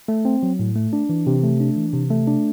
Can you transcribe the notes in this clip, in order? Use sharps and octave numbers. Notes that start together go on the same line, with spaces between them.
A3
C4
F#3
A2
A3
D4
E3
C3
A3
D4
E3
C3
A3
D4